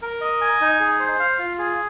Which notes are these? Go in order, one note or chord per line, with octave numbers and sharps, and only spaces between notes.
A#4
D#5
G#5
D#4
G#4
C5
F5
F4
G#4